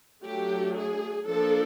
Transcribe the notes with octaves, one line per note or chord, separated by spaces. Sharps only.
F#3 A3 D4 G4
G#4
F3 A#3 D4 A4